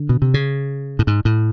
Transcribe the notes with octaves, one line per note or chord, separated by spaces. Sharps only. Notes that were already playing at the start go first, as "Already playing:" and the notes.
Already playing: D3
B2
C3
C#3
A2
G#2
A2